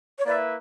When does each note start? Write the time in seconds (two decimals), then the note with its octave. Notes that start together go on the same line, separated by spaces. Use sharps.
0.19 C#5
0.26 A#3 E4 B4 D5 E5